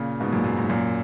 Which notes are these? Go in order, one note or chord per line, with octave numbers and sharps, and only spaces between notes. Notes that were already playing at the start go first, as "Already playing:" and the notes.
Already playing: A#2 C#3
G#2 B2
F#2 A#2
F#2
G#2
F#2 A#2